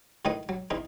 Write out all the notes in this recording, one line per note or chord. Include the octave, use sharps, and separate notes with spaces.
A2 D#3 G#4 B4 D#5 D#6
F#3
E2 E3 D#4